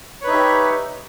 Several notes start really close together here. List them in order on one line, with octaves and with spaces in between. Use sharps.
C#5 B4 D#4 E5 G4